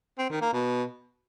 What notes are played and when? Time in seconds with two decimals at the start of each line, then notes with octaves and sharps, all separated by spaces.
0.18 C4
0.30 D#3
0.41 A#3
0.53 B2